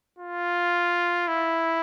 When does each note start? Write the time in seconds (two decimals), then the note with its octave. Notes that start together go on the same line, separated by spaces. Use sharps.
0.19 F4
1.28 E4